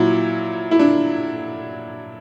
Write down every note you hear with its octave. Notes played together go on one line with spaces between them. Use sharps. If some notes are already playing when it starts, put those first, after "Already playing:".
Already playing: A#2 F#3 E4
E4
D4